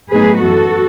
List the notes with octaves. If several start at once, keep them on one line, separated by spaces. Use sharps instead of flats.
A2 F#3 B3 D#4 G#4 B4
F#2 E3 B3 F#4 A4